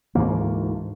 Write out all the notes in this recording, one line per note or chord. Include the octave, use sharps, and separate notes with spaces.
D2 G#2 E3 A#3